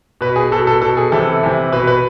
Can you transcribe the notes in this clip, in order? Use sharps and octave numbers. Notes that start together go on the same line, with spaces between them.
B2 B4
G#4
B2 A4
A4
B2 A4
G#4
C3 E3 A4
C3 E3
B2 B4
B4